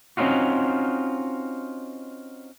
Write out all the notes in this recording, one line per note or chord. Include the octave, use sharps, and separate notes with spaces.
C4 C#4 D#4 F4 F#4